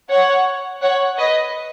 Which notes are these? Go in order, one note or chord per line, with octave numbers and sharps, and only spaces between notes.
C#5 F#5
C#5 F#5
B4 D#5